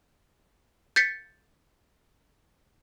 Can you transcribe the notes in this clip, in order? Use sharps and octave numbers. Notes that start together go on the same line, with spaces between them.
G6 A6 B6 C#7